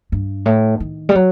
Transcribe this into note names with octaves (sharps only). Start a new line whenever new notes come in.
G2
A2
D#3
G3
F#3